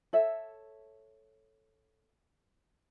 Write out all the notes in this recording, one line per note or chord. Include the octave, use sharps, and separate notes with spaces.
A4 C#5 E5